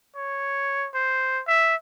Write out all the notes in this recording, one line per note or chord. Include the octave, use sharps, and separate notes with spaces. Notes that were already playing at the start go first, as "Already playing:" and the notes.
C#5
C5
E5